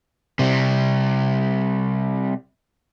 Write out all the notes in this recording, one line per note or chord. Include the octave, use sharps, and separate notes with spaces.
C3 G3